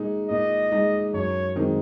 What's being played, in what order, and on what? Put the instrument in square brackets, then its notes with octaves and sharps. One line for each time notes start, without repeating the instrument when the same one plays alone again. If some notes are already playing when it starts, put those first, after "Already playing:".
Already playing: [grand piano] A#2 G#3 D#4
[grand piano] A#2 [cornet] D#5
[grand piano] G#3 D#4
[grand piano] F#2 [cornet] C#5
[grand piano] D#3 G#3 C4 D#4